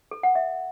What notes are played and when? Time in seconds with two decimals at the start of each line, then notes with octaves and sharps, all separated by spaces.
0.11 A4
0.23 F#5
0.35 E5